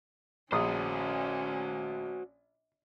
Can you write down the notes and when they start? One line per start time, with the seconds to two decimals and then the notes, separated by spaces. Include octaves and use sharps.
0.52 A#1 C#4 F#4 C5 D#6